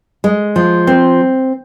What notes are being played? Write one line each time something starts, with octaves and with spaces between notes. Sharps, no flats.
G#3
F3
C4